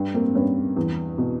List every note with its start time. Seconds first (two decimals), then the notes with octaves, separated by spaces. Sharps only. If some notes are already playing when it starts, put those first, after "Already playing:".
Already playing: G2
0.14 A#3 C4
0.35 G2 B3 C#4
0.77 E2
1.18 B2